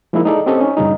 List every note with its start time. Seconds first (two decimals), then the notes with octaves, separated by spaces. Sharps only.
0.13 F3 G#3 A#3 D#4 E4
0.25 D#4 G#4 A4 D5
0.46 C4 C#4 G4 A4 D#5
0.61 C#4 D#4
0.77 G2 C#3 G3 D#4